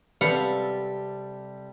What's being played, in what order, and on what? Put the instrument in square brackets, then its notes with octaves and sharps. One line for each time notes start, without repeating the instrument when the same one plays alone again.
[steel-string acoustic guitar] C3 G3 A4 [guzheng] B4 F5 F#5